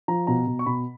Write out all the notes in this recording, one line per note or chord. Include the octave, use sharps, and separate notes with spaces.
F3 A#5
B2 A#5
B2
C#6
B2 B5